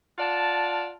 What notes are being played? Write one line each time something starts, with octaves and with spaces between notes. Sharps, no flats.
F4 D5 F#5 A5